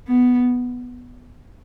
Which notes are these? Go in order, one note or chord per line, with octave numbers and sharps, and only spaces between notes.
B3